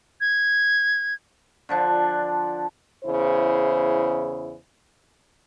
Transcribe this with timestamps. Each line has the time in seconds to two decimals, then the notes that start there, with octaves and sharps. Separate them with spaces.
0.21 G#6
1.69 D3 F3 D4
3.04 E2 C#3 E4 C5